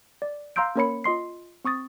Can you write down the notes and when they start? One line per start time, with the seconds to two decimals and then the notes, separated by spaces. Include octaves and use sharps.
0.22 D5
0.56 F5 A#5 C6 E6 G6 D7
0.76 A#3 C#4 A#4 C#5 B5 C#7
1.04 F4 D#5 C6 C7
1.65 C4 C#6 D#6 A6